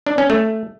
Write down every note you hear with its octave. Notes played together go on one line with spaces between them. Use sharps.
D4
C#4
A3